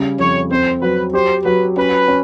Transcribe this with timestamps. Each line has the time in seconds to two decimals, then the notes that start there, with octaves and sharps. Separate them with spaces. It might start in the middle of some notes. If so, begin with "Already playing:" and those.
Already playing: C#3 G3
0.19 F2 C#5
0.51 C4 C5
0.82 F#3 B4
1.14 G4 C5
1.45 F#3 B4
1.77 C#4 B4
2.08 C#4